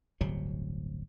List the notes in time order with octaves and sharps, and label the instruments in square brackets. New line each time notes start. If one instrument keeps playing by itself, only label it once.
[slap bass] D1 G1 C3 F#3